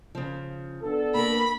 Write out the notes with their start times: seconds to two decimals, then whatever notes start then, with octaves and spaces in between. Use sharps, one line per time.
0.15 C#3 F3
0.83 B3 D4 A4
1.14 A#3 A#4 B5